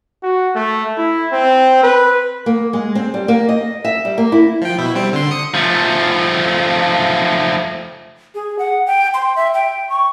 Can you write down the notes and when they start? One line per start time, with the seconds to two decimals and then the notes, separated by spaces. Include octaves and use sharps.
0.23 F#4
0.55 A3
0.97 E4
1.32 C4
1.83 B4
2.46 A#3
2.73 G#3
2.95 C4
3.14 G3
3.28 A#3
3.49 D#5
3.85 E5
4.05 G3
4.18 A#3
4.32 E4
4.62 F3 G5
4.78 B2 E4
4.95 G3 C4
5.13 D3 C6
5.31 D#6 C#7
5.54 F3 A3
8.35 G#4
8.59 F#5
8.87 G5
9.14 C6
9.36 E5
9.54 G5
9.89 C#6